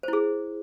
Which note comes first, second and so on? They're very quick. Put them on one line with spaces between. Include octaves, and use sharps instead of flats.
C5 E4 G#4